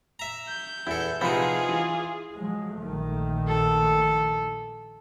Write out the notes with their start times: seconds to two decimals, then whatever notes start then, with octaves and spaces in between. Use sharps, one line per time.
0.19 E5 A#5
0.48 G6
0.87 E2 E4 A4
1.21 C3 F3 B3 D#4 F4 G#4 B5
1.69 E3
2.34 F3 F#3 G#3
2.80 A#1 D#3 A3
3.48 A4